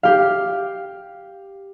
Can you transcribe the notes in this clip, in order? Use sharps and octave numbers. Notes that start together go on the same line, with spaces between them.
G4 F5